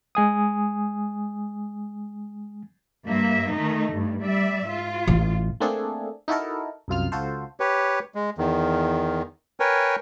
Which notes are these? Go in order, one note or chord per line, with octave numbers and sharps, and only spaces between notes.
G#3 G#5 D#6
G2 A#3 E5
D#3 A3 D#4
G2
G3 D5 E5
G#2 F4
A1
A3 A#3 C4 D4 G#4 A4
D#4 E4 F#4 A4 A#4
C2 F#2 F4 F6
C#2 F4 F#4 A4 C5
G4 B4 C#5
G#3
E2 D#3
A#4 B4 C#5 G5 G#5